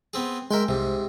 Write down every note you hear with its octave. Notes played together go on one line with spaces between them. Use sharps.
B3 C4 G#4
G#3 A#4 E5 G5 C6
C2 G#2 C3